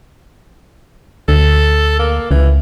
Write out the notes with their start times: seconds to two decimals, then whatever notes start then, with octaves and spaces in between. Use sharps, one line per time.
1.28 D2 A4
1.99 A#3
2.31 C#2 E3